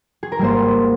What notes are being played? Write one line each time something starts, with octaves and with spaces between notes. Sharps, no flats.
G#4
A#4
G#1 G#2 G3 A#3 C5